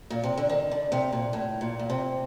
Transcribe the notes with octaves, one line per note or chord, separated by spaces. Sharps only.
A#2
C3
D3
D#3
D3
C3
A#2
A2
A#2
A#2
C3